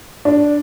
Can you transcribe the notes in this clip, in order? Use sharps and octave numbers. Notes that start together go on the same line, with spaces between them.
D4